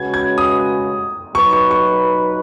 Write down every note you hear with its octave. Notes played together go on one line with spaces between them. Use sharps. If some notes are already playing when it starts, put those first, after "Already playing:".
Already playing: C#3 G#3 C#4 F#4 B4 G#6
G#6
D#6
F#3 D#4 B4 C#6
C#6
C#6